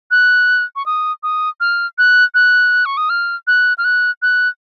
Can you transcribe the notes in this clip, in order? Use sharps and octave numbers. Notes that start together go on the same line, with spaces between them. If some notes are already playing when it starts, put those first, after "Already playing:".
F#6
C#6
D#6
D#6
F6
F#6
F#6
C#6
D#6
F6
F#6
F6
F#6
F#6